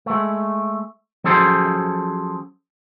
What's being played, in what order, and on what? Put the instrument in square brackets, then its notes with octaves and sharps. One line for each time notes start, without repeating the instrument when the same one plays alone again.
[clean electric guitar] G#3 A3
F3 F#3 C#4 G#4 A4 C5